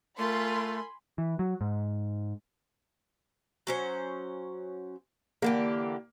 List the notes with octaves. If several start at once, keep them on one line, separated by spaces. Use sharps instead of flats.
A3 F4 A#4 G#5 B5 C6
E3
F#3
G#2
F#3 C#4 C5
D3 E3 A#3 G4